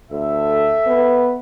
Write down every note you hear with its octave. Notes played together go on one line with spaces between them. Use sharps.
D2 A4 E5
B3